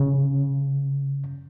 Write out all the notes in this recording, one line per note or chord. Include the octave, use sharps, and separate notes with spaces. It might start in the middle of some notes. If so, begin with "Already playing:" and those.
Already playing: C#3